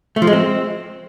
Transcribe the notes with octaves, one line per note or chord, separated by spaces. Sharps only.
A3
F3
G#3
C4